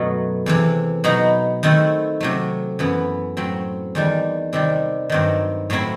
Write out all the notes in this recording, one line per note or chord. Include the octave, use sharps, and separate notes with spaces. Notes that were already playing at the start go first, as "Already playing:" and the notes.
Already playing: F#2 B2 F#3 A3
E2 C3 E3
B2 F#3 B3 D#4
D#3 A3 C4 E4
C3 F#3 A3
F#2 E3 B3
A2 F#3 C4
E2 D#3 G3
C3 D#3 G3 C4
G2 D#3 F#3 C4
A2 F#3 C4 E4